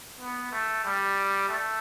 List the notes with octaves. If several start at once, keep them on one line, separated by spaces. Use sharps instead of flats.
B3
A3
G3
A3